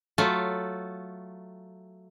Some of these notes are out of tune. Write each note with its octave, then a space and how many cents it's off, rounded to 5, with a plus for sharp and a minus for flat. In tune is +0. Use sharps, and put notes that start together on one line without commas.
F#3 +0 A3 +0 F4 +0